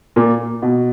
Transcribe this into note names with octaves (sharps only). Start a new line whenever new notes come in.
A#2
B2